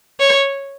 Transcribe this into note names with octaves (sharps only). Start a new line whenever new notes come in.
C#5